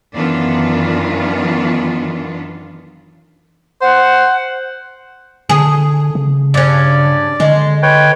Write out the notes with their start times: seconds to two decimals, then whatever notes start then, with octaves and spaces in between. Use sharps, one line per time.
0.13 F#2 D#3 E3 B3 D4 F4
3.82 C5 F#5
5.49 D3 G#4
6.15 C#3
6.54 G2 C#4 D5
7.40 D3 G#3
7.83 B4 C#5 G5